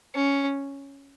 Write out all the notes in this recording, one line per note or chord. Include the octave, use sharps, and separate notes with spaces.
C#4